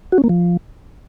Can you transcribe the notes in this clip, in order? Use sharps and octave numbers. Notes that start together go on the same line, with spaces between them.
F#4
C#4
A#3
F3